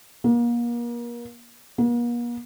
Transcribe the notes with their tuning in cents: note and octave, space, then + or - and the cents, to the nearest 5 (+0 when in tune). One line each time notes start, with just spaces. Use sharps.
A#3 +35
A#3 +45